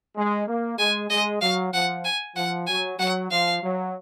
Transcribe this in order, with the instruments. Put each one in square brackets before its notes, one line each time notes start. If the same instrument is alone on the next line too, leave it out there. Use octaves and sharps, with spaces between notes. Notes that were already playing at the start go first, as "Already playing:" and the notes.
[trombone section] G#3
A#3
[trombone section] G#3 [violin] G#5
[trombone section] G#3 [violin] D#5
[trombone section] F#3 [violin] F5
[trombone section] F3 [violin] F#5
[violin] G#5
[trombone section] F3 [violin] F#5
[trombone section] F#3 [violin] G#5
[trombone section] F#3 [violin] F#5
[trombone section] F3 [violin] F5
[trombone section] F#3